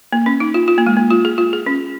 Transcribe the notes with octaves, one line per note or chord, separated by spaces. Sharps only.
A#3
C#4
D#4
F4
F4
A#3
G#3
A#3
F4
G#4
F4
G#4
C#4